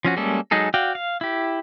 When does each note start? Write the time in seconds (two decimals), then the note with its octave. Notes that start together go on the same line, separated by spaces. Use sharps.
0.05 F3 C#4 F#4
0.17 G3 G#3 A#3 C#4 A4
0.51 F#3 G#3 D#4 G#4 A4
0.74 F#4 D5 F5 G5
0.95 F5
1.21 E4 G4